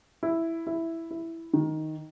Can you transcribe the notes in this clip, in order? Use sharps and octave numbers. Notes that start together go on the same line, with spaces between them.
E4
E4
E4
D#3